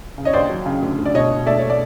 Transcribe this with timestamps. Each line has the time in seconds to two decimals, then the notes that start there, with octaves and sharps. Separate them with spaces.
0.18 C#3
0.25 C#5 D#5
0.33 D#2 C5 D5
0.50 F#3
0.66 C#3
0.82 D2
0.98 D2
1.05 D5
1.14 B2 C#5 D#5
1.30 B2
1.46 A3 D5 E5
1.59 A3 C#5
1.70 D5